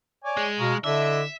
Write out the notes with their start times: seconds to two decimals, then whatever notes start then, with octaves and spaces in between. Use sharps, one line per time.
0.24 C#5 D5 G#5
0.37 G#3
0.59 B2 F5 A#5 C#6
0.84 D3 D4 E4 D#5 E5